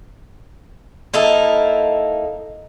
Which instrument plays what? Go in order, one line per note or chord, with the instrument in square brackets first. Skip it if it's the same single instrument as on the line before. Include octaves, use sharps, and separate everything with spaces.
[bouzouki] A#3 D#4 E4 A4